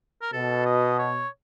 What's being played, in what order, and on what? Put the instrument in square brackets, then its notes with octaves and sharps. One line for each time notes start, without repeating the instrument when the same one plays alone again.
[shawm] A#4
[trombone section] B2 [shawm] A4
[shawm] D#5
C#5